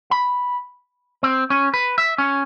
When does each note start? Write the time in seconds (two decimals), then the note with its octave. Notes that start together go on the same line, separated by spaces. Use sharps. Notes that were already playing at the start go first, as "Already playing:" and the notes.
0.11 B5
1.23 C4
1.50 C#4
1.74 B4
1.98 E5
2.18 C#4